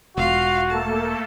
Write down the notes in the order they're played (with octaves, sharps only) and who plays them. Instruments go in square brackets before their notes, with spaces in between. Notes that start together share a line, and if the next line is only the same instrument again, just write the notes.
[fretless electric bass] E1 [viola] F4 F5 [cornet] F#4
[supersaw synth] A3 A#3 A4 [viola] A5